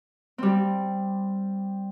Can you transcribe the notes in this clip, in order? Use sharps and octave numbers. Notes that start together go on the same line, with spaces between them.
G3 C4